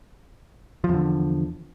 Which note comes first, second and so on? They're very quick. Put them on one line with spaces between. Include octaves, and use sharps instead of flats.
F3 E2 D3